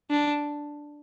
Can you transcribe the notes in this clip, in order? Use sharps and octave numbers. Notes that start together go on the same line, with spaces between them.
D4